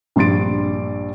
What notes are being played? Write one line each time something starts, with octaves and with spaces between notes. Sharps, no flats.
A#1 G2 C6 A6 D7